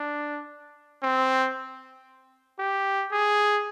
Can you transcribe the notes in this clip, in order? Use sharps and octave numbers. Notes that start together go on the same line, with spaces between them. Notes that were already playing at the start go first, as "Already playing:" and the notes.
Already playing: D4
C4
G4
G#4